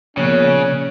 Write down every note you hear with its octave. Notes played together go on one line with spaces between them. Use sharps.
A#2 C#3 F3 A#3 B3 C#4 C#5 F#6